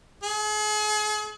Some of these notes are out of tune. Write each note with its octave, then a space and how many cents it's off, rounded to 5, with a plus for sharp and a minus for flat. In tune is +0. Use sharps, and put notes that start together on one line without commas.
G#4 +40